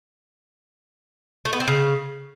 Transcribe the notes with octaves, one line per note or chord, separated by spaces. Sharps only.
A3
B3
C4
C#3